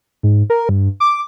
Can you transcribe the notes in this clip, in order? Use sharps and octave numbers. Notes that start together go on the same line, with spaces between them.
G#2
A#4
G2
D6